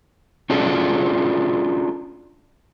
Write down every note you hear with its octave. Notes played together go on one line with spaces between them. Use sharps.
C#4 D4 F4 F#4 G#4 A4